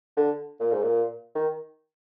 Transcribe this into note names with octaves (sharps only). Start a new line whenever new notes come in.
D3
A#2
G#2
A#2
D#3